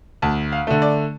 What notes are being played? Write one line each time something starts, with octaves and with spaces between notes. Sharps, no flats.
D2 A5
F5
D3 A3
D5